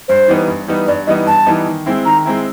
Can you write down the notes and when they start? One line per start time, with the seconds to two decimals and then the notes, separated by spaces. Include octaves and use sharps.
0.08 G2 C5
0.28 E3 G3 B3 D#4
0.48 G2
0.67 E3 G3 B3 D#4
0.87 G2 D5
1.07 E3 G3 B3 D#4 D#5
1.26 G2 A5
1.46 E3 G3 B3 D#4
1.67 D#3
1.86 G#3 C4 E4
2.05 D#3 A#5
2.25 G#3 C4 E4